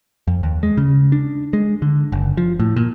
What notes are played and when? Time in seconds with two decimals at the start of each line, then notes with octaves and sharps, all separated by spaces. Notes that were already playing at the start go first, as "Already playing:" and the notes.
0.27 F2
0.43 D#2
0.63 G#3
0.77 C#3
1.12 D4
1.53 G#3
1.82 D3
2.12 F#1
2.37 F3
2.60 A2
2.76 A#2